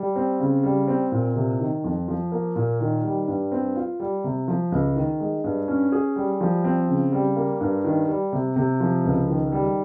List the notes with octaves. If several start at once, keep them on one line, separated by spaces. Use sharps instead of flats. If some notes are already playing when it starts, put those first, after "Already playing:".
Already playing: G3
C4
C#3
G3
C4
A#2
C3
D#3
F2
F3
A#3
A#2
D#3
G3
G2
C4
F4
G3
C3
F3
C#2
D#3
G#3
G2
C#4
G#4
G3
F3
C4
C#3
G3
A#3
G2
D#3
G3
C3
C3
F3
C#2
D#3
G3